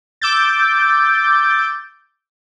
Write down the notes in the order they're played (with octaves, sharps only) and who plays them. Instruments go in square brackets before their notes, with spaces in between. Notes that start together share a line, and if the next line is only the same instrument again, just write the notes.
[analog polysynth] D6 E6 G6 A6